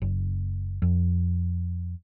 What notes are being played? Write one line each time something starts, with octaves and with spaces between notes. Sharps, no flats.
F#1
F2